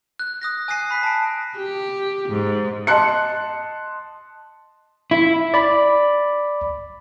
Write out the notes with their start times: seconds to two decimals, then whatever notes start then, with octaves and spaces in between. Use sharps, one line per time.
0.19 F#6
0.42 D#6 F#6 A#6
0.68 G#5 D#6 F#6 A#6 C7 D#7
0.91 B5 B6
1.03 A5 D7
1.56 G4
2.28 G#2
2.87 D#5 A5 C6 F#6 C#7
5.11 E4
5.54 D5 B5